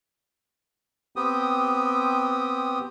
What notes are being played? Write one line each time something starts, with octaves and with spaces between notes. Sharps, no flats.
B3 C4 G4 D#6